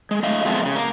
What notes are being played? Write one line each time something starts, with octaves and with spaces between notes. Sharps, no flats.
G#3
A3 D#5 F5
F2 B2 G#3 A3 B3 C4
A#2 C#3
A#3